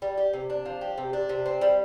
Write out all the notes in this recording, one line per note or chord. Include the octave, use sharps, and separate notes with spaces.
G3
G4
C3
D4
F3
G4
C3
D4
C3
C4
G3